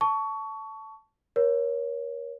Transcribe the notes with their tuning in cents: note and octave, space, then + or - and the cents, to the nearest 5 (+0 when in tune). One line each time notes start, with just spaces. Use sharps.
A5 +0 C#6 +20
A#4 +35 C#5 +0